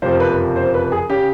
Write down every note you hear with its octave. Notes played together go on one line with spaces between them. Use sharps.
F#1 F2 C3 F3 C5
B4
C5
B4
G#4
C#3 G4